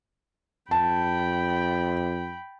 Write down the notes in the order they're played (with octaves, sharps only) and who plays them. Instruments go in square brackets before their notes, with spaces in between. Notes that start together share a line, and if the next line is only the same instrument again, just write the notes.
[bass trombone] F2 [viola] G5 B5 [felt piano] A5